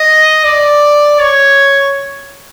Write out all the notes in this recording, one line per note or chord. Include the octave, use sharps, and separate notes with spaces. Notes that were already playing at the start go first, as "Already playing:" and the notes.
Already playing: D#5
D5
C#5